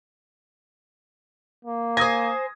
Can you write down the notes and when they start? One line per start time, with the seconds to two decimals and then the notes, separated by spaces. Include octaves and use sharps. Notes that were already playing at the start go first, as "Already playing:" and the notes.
1.65 A#3
1.97 C5 G#5 D#6 G#6 A#6